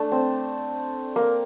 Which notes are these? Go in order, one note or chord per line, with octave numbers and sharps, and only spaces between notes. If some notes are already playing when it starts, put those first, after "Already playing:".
Already playing: A3 D4
C4
A#3